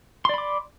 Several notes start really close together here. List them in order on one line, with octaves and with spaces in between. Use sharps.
C6 D5 B5 D6